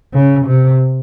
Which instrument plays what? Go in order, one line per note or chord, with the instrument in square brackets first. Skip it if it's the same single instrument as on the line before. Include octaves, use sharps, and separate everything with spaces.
[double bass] C#3
C3